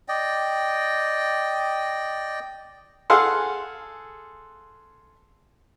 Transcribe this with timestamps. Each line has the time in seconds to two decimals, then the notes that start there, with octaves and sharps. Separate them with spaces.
0.08 D5 D#5 G5
3.10 G#4 A4 F5 F#5 C6